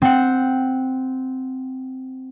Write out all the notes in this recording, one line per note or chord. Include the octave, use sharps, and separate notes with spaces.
C4 F#5